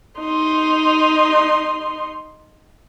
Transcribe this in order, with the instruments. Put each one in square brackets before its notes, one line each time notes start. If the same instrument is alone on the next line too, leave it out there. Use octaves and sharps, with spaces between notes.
[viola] D#4 C6